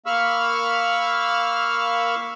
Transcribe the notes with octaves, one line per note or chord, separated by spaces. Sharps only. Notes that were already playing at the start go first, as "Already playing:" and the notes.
A#3 F5 B5 C#6 E6 F6